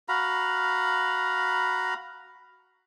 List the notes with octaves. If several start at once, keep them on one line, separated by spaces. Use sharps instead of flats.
F#4 F5 A#5 B5